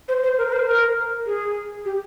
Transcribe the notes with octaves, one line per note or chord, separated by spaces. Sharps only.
C5
C5
A#4
A#4
C5
A#4
G#4
G4